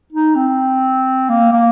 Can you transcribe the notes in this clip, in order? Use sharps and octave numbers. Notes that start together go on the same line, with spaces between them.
D#4
C4
A#3
A#3